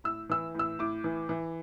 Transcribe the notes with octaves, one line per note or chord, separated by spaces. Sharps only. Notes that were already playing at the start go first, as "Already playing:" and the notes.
A2 E6
E3 E6
A2 E6
A2 D6
E3
E3